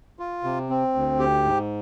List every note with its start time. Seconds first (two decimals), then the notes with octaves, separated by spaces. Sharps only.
0.19 F4
0.44 C3
0.70 C4
0.95 D2
1.19 G4
1.44 G#2